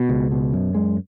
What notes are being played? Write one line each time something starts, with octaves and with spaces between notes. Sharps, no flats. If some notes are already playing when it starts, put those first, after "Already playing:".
Already playing: B2
C#2
B2
F#2
G#3